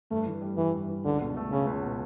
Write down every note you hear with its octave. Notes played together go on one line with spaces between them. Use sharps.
G2 A3
E3
G3
G2 E3
G2
E3
C#2 D3
B2
A3
C#3 C#4
C#2
B2